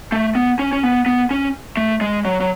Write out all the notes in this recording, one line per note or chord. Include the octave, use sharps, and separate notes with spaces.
A3
B3
C#4
C#4
B3
B3
C#4
A3
G#3
F#3
F#3